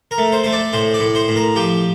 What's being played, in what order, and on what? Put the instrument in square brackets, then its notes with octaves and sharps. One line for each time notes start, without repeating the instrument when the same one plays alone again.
[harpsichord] A#4
A3
C5
A3 C5
D5
A2 C5
D5
A2
C5
A2
A#4
F3 G4